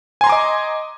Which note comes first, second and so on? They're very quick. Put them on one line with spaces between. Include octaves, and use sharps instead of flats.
G#5 C6 A#5 D6 D#5